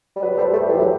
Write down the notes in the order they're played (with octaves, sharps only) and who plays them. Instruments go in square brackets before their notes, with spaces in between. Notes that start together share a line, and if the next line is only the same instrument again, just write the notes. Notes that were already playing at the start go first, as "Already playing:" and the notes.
[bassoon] G3
[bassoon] F#3 [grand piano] B4 D5
[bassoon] G3 [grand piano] A4 C5
[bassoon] A3 [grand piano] G4
[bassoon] E3 [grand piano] G4
[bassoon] F#3